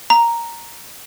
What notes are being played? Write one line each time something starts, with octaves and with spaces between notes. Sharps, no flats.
A#5